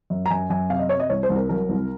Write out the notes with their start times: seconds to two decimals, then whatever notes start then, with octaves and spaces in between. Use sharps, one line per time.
0.10 F#2
0.26 A#5
0.30 F#2 G#5
0.50 F#2 G#5
0.70 C3 F5
0.79 D#5
0.89 C3 C#5
1.00 D#5
1.10 C2 C#5
1.23 C5
1.30 C2
1.36 A#4
1.49 F#3 A#4
1.69 C2